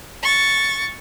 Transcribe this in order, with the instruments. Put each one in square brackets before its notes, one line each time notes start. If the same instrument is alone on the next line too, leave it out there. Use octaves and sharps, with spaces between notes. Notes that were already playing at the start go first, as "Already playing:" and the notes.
[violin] C#6 A6